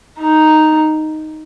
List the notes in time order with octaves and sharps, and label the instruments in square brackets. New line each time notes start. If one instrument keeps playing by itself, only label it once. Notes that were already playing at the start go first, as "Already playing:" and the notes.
[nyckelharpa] D#4